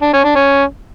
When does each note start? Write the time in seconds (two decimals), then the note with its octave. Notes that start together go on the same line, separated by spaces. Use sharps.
0.02 D4
0.13 C#4
0.25 D4
0.36 C#4